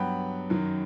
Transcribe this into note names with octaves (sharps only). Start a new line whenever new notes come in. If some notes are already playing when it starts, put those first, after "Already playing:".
Already playing: G2 F#3 B3 F#5 G5 B5
F#2 D#3 F#3